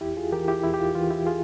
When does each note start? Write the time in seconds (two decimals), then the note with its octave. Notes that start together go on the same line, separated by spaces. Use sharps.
0.01 E2 E4 G4
0.17 F4 G#4
0.32 E3 G4 A#4
0.48 E4 G4
0.63 E2 E4
0.74 G4
0.80 F4
0.95 E3 F4
1.10 E4 G4
1.26 F4 G#4